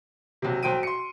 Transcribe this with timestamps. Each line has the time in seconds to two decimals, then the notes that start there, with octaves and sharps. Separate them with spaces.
0.42 B1 C3
0.63 B1 C5 G5 D7 D#7
0.83 C6 C#7